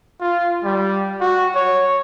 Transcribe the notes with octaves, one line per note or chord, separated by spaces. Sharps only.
F4
G3
F#4
C#5